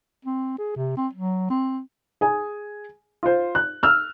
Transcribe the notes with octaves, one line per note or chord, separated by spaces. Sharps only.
C4
G#4
C3
C4
F#3
C4
G#4 G#5
F4 C5
F#6
E6 F6